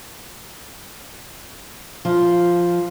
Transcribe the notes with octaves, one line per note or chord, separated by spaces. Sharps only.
F3